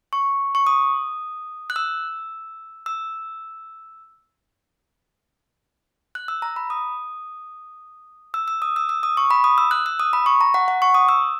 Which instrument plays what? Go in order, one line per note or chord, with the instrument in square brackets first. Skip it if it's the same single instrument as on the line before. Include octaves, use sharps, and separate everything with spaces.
[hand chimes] C#6
C#6
D#6
F#6
E6
E6
F#6
E6
A#5
B5
D#6
E6
E6
D#6
E6
E6
D#6
C#6
B5
D#6
E6
F#6
E6
D#6
B5
C#6
A#5
F#5
F#5
C#6
D#6
E6